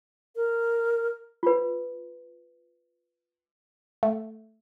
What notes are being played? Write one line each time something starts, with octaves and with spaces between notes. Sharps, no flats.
A#4
F4 B4
A3